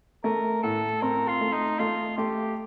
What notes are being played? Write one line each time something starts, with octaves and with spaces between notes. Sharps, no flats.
A3 A#4
A2 A4
C4 A#4
F4
A3
D#4
A3 F4
A3 G4